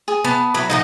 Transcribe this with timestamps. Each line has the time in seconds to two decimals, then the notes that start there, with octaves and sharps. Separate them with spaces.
0.08 G#4
0.24 B3 A5
0.54 F#3 E4 B4
0.70 A#2 F3 D#4 D#5 F#5 A#5